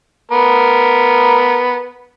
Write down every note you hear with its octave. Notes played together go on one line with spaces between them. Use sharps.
B3 A#4